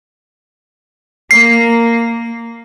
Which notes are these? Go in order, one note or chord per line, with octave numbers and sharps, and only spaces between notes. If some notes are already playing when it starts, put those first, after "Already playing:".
A#3 C7